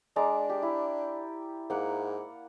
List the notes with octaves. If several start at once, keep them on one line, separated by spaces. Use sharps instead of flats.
G#3 D4 D5 A#5
G4
E4
G#2 A#3 F#5